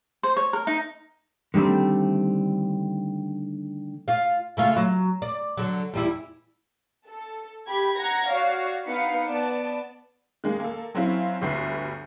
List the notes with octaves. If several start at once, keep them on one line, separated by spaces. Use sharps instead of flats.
C5
C#5
A#4
D#4
D3 D#3 G3 A3 C4
F4 F5
C#3 A3 F4
F#3
D5
D3 F#3
E2 G3 E4
A4
G4 B5 G#6
F#5 A#5 G#6 A#6
F#4 C#5 D5 F5
B3 D#4 F5 B5 C#7
B3 D5 A5
D#3 G#3 A#3
A#3 A4
F#3 C4 C#4 E4 F4
G1 D2 B4 C7